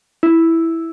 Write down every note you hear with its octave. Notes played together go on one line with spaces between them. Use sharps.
E4